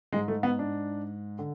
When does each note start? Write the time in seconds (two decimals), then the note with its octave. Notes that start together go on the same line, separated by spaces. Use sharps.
0.12 G#2 G#3
0.28 A3
0.43 B3
0.59 D4
1.39 D3